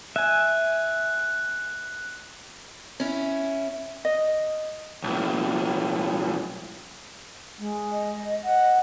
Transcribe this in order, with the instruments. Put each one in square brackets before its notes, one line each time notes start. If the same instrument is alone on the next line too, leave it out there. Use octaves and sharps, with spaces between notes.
[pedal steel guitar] E5 G#5 [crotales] F#6
[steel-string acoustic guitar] C#4 E4
[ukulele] D#5
[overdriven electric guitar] B1 A2
[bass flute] G#3
[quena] D#5
[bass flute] F#5